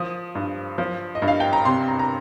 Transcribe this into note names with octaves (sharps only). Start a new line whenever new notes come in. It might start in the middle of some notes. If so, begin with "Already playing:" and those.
Already playing: F3 D#6
G2
F3
D#5
G2
F5
G5
A#5
C3 C6
A#5
A#5